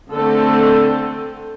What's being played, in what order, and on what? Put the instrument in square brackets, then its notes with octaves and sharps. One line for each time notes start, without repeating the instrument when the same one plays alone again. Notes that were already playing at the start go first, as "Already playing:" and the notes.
[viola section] D3 A3 C4 A4